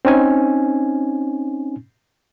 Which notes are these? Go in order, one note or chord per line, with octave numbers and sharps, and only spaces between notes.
C4 C#4 D#4 G#5